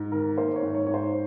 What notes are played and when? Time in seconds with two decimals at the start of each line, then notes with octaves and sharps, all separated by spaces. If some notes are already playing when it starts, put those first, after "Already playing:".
Already playing: G#2
0.12 D#3 A#4
0.38 A#3 C5
0.56 C#5
0.62 G#2
0.75 C#5
0.87 G#2 C#5
0.94 C5